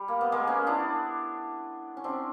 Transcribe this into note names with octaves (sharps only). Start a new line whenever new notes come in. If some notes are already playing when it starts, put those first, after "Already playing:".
Already playing: G3
A#3
B3
G#3 A#3
B3 C#4
D4 E4
C#4
C4 D4